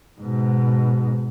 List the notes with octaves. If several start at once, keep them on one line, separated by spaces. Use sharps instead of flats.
G#2 B2